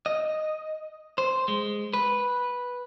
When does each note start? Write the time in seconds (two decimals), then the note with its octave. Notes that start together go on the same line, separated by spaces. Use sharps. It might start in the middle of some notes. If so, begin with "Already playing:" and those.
0.06 D#5
1.18 C5
1.48 G#3
1.94 B4